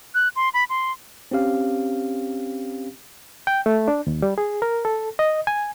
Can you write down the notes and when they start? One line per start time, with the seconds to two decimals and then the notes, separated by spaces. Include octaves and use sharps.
0.14 F#6
0.36 C6
0.54 B5
0.69 C6
1.31 C4 C#4 G4 F5
3.47 G5
3.66 A3
3.88 D4
4.07 D#2
4.22 G3
4.38 G#4
4.62 A#4
4.85 A4
5.19 D#5
5.47 G#5